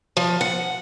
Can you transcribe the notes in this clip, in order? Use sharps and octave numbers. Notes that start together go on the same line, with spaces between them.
F3
F#5